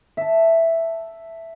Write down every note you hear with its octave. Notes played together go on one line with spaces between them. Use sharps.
E5 A5